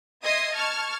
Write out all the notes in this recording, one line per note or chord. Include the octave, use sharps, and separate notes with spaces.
D#5 E5 C6 D#6 G#6
A5 C#6 F6 G#6